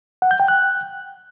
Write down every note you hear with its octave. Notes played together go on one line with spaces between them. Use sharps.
F#5
G6
G5
F#6